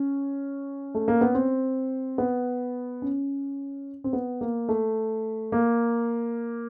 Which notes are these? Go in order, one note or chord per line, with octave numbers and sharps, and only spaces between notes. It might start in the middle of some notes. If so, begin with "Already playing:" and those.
Already playing: C#4
A3
A#3
B3
C4
B3
C#4
C4
B3
A#3
A3
A#3